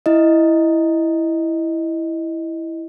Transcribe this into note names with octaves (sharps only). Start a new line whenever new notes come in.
E4 D#5